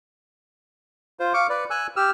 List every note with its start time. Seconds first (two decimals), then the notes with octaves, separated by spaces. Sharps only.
1.20 F4 C5
1.34 F5 C#6 D6
1.49 B4 D5
1.70 G#5 E6 F#6
1.96 G4 E6 F6